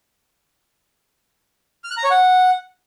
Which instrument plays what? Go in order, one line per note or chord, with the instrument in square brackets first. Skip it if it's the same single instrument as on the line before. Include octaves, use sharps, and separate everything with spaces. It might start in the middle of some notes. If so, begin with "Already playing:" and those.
[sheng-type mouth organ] F6
F#6
A#5
C#5
F#5